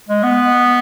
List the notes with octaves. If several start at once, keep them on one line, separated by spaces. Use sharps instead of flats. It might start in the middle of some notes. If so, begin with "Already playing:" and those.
G#3
B3